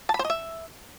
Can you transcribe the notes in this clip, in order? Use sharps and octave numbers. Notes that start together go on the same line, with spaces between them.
A5
B5
C5
D#5
E5